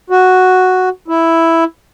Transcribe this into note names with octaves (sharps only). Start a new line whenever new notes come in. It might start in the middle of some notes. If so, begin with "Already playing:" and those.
F#4
E4